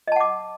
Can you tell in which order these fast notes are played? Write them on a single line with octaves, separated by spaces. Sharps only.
D#5 A5 F#5 D6